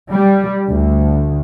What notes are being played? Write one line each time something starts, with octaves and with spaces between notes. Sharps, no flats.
G3
D2